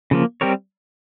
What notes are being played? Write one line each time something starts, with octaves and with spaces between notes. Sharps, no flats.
C#3 F3 A#3
G3 C4 G4 A#4 C#5